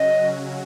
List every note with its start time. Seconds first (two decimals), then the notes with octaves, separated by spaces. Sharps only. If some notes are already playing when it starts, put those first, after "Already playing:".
Already playing: C#3 F#3 C#4 F#4 D#5